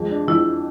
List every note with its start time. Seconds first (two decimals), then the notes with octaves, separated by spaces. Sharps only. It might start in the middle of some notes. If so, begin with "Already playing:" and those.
Already playing: F2 G#3
0.10 D4
0.28 F2 E4